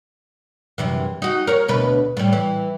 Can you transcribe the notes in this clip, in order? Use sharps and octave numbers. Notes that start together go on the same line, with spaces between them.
F#2 C3 E3
D#4 F#4
A#4 C#5
D2 B2 B4
A2 G3
E3